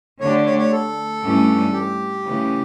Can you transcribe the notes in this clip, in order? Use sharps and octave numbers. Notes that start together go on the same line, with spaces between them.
D3 A3 D4 G4 C#5
C#5
C#5
A4
G2 E3 A3 C#4 G4
G4
C#3 E3 A3 C#4